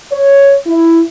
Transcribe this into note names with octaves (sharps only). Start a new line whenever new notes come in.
C#5
E4